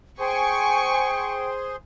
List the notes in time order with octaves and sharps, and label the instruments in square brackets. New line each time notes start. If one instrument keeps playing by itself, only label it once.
[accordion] G#4 C5 [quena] G5 [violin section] G#5 C#6